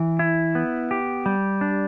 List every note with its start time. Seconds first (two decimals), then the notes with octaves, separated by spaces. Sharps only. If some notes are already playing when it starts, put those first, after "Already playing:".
Already playing: E3
0.19 E4
0.55 B3
0.91 G4
1.26 G3
1.61 D4